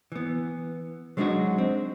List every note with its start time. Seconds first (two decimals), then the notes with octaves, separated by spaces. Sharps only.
0.12 E3 B3
1.17 F#3 G#3 B3 D4 D#4 F#4
1.58 C4